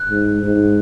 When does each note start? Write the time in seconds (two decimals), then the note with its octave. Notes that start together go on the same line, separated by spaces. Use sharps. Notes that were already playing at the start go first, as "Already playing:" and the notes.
Already playing: F#6
0.10 G#2
0.43 G#2